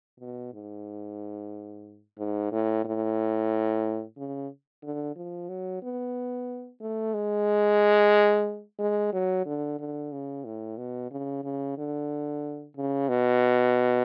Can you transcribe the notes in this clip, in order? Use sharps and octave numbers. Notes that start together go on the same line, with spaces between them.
B2
G#2
G#2
A2
A2
C#3
D3
F3
F#3
B3
A3
G#3
G#3
F#3
D3
D3
C#3
A2
B2
C#3
C#3
D3
C#3
B2